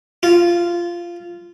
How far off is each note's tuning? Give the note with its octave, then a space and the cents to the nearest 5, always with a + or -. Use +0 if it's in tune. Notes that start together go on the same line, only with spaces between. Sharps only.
F4 -15